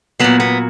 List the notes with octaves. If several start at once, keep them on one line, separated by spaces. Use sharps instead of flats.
A#2 F#3 B3
B3